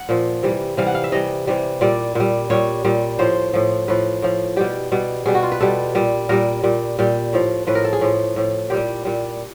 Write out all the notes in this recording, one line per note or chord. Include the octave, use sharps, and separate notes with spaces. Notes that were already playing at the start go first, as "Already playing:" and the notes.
Already playing: F#5
A#2 F3
C3 E3 G3
C3 E3 G3 F5
F#5
F5
E5
C3 E3 G3 D#5
C3 E3 G3
A#2 G3 D5
A#2 G3
A#2 G3 C#5
A#2 G3
A2 F3 C5
A2 F3
A2 F3 B4
A2 F3
B2 G3 G4
B2 G3
B2 G3 G#4
F#4
F4
B4
B2 G3 A4
A#2 G3
A#2 G3 A#4
A#2 G3
A#2 G3
A2 F3
A2 F3 B4
A#4
A4
G#4
A2 F3
A2 F3
A#2 G3 G4
A#2 G3